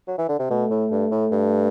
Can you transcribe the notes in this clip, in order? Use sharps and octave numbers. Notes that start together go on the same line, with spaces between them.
F#3
E3
D3
C3
B2 A3
A2
G2
A2
G2